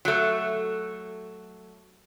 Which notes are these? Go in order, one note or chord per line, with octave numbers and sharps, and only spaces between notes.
F#3 A3